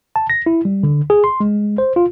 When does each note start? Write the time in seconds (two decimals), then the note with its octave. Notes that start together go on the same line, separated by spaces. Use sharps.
0.16 A5
0.30 A#6
0.46 E4
0.65 G3
0.83 D3
1.10 G#4
1.24 C6
1.40 G#3
1.78 C5
1.96 F4